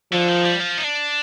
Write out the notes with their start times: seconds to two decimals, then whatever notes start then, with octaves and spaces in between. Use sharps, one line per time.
0.12 D3 F3
0.28 D#3
0.44 G3
0.60 F3
0.78 D#4
0.84 D4